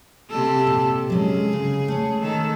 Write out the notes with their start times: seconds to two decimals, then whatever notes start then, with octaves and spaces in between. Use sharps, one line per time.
0.30 C3 G4 A4
0.67 A#2
1.10 F#3 G#3 C#4 G#4
1.53 C#3
1.88 A3 C#5
2.21 D#3 A4